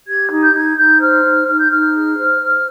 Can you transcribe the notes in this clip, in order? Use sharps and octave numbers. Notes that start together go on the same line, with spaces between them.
G4 G#6
D#4
G6
D#4 G#6
D#4 G6
C5 F6
D#4
D#4 F6
G6
D#4 F6
G#4
C5
C5